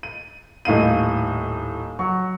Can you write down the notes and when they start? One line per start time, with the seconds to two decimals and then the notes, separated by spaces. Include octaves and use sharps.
0.03 D#7
0.65 D#1 A2 D#4 F5 D#7
1.99 F#3 C#6